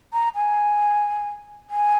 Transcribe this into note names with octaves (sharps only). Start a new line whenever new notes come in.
A#5
G#5
G#5